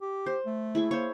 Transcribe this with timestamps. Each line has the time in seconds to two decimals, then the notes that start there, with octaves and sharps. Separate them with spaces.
0.01 G4
0.26 C5
0.46 A3
0.75 E4 G#4 C#6
0.91 A#3 C5 C#5